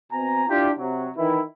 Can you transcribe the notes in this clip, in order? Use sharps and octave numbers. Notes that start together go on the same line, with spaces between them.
B2 C4 G#5 A#5
D4 E4 F4 G4
C3 F#3
D#3 E3 E4